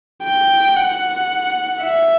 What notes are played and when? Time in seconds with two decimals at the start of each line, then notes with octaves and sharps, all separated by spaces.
0.23 G5
0.77 F#5
1.83 E5